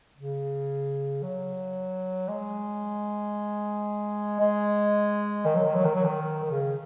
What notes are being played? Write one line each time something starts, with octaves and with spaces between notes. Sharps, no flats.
C#3
F#3
G#3
G#3
D#3
F#3
D#3
F#3
D#3
F#3
D#3
D#3
C#3